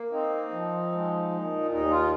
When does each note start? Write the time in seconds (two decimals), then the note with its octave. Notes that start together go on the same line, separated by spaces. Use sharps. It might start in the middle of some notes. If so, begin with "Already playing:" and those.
Already playing: A#3
0.12 C4 D#4
0.52 F3
0.92 G#3
1.31 A#2
1.71 D#2 D#4
1.91 F4